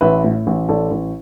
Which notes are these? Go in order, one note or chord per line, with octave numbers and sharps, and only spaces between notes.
A1 B4 E5
A2
A1
A1 A4 D5
A1